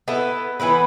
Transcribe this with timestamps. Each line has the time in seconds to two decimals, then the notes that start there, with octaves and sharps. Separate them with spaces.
0.08 B3 E4 A4
0.60 E3 B3 E4 B4